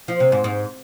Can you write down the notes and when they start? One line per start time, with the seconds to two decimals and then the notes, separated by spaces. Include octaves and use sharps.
0.08 F3
0.20 C3
0.32 G#2
0.44 G#2